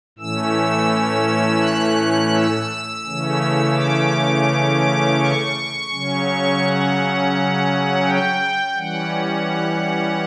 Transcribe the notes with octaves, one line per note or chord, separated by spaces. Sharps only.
A2 E3 A3 C#4 E6
F#6
E6
C#3 E3 A3 C#4
D6
C#6
C#3 F#3 C#4
F#5
G5
E3 G3 C#4 F#5